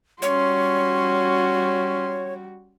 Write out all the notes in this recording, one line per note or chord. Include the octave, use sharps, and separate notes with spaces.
G3 C#4 F#4 C#5 C6